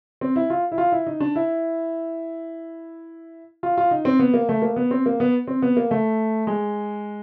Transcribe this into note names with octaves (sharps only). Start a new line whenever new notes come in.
C4
E4
F4
E4
F4
E4
D#4
D4
E4
F4
F4
D#4
C4
B3
A#3
A3
A#3
B3
C4
A#3
B3
C4
B3
A#3
A3
G#3